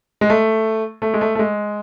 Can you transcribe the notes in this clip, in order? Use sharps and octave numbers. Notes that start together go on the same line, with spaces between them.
G#3
A3
A3
G#3
A3
A3
G#3